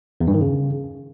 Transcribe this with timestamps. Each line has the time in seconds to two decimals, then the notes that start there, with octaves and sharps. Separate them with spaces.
0.21 E2
0.27 G2
0.34 D#3
0.41 C#3